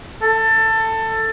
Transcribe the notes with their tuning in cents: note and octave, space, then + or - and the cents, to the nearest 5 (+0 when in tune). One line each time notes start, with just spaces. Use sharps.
A4 +20